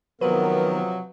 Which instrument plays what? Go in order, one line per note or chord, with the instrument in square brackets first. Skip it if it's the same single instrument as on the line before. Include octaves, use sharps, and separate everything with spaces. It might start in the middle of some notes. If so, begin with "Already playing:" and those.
[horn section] C3 F3 F#3 [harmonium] D#3 B3 A#4 [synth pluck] B4